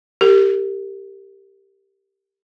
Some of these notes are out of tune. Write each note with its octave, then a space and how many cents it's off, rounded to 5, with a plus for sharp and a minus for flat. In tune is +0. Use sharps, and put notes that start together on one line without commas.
G4 +0 A#4 -40